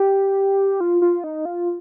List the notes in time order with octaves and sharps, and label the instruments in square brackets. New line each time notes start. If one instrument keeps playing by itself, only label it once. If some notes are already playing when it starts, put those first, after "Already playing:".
Already playing: [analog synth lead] G4
F4
F4
D#4
F4